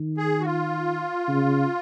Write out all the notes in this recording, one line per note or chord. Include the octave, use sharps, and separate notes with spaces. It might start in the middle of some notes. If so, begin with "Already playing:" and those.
Already playing: D#3
G#4
F#4
F4
C#3